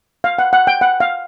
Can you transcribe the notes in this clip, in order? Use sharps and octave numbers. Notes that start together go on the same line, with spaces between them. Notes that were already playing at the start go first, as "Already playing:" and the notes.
F5
F#5
F#5
G5
F#5
F5